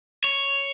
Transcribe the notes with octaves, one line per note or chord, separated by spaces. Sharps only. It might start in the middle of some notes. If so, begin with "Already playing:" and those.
C#5